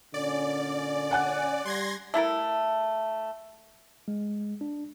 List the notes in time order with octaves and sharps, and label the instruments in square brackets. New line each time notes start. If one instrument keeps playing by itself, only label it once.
[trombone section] A#2 D3 C#4 [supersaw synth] D5
[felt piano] F#5 G#5 F#6
[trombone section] G3 [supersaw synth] C6 G#6 A#6
[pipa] A3 E4 A4 A#4
[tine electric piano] G#3
D4